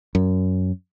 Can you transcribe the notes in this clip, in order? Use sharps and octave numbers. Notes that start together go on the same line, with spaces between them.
F#2